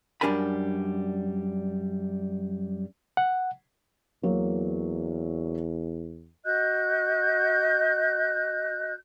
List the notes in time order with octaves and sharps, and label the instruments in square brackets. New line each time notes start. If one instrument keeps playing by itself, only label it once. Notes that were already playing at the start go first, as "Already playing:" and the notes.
[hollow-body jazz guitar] F#2 G3 D4 A#4 G#5 B5
[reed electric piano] F#5
[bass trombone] E2 [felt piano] F#3 A#3
[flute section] F#4 D#5 F#6 G6